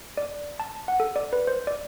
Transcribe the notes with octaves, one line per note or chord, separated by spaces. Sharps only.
D5
A5
F#5
A4
D5
B4
C5
D5